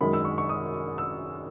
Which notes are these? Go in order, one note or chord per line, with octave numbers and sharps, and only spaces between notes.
F#2 D#3 G#3 B5
E6
C#6
C#6
D#6
E6